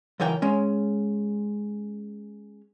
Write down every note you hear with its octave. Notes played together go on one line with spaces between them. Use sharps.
C#2 F#2 E3 A#4 G5
G#3 C#4